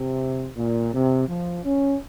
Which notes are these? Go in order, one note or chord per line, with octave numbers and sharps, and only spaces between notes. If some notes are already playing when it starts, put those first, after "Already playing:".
Already playing: C3
A#2
C3
F3
C#4